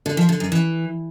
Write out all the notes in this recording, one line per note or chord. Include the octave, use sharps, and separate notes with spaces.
D3
F3
D3
F#2
E3